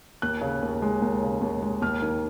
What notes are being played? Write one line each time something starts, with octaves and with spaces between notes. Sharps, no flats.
D#2 F#6
C#3
D#2
G#3
D#2
C#3
D#2
G#3
D#2 F6
D#3